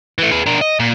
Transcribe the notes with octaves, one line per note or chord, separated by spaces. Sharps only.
E3 A3
G#4 B4
D4 A#4
D#5
A#2